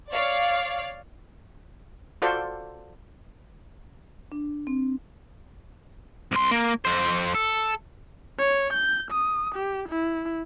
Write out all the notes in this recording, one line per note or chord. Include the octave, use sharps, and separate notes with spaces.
C#5 D5 F5
F4 F#4 A4 C5 D5
D4
C4
C2 C6
A#3
F2 C5
A4
C#5
G6
D#6
G4
E4